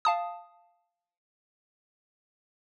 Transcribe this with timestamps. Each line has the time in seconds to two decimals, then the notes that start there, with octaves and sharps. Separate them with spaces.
0.05 F5 A5 D#6